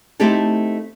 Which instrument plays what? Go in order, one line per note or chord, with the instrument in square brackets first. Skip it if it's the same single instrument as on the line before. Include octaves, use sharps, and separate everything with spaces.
[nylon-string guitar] A3 C4 D#4 E4 G4 A4